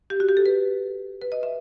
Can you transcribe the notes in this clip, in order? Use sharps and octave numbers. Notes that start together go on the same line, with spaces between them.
G4
F#4
G4
A4
B4
B4
D#5
E5